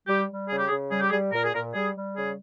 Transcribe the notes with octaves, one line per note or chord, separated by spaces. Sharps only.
G3 G4
G3
C#3 G#4
G4
G#4
C#3
G3 G#4
G4
G3 G#4
A#2 A#4
G#4
A#2 A#4
G3 G#4
G3
C#3 G#4